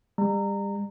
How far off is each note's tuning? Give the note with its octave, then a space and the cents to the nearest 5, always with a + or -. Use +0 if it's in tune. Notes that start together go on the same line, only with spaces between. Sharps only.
G3 +35 A#5 -20